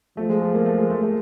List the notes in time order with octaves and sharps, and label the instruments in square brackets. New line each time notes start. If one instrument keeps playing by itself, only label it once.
[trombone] F3 [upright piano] A3
[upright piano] G#3
A3
A#3
A3
G#3
A3
A3